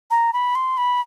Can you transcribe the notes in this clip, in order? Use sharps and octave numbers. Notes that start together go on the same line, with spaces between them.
A#5
B5
C6
B5